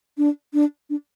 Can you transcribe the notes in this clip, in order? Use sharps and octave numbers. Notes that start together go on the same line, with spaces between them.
D4
D4
D4